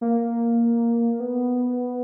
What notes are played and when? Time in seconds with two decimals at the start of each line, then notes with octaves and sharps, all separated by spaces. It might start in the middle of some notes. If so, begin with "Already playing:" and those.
0.01 A#3
1.20 B3